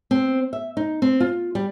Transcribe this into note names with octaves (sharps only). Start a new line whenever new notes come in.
C4
E5
D#4
C4
F4
G3